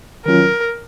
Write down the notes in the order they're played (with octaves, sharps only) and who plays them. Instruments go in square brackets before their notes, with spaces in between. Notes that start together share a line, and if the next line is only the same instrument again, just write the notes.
[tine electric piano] D#3 F#3 C#4 F4 [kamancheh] A#4